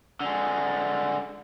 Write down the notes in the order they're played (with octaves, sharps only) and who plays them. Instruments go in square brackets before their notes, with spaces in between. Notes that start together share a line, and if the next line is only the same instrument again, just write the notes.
[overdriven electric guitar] D3 G#3